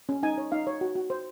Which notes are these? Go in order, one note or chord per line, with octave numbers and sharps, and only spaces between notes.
C#4
D#4 G#5
C#5
D#4 F5
C#5
F#4
F#4
C5